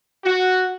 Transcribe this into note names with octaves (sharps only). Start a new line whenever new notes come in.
F#4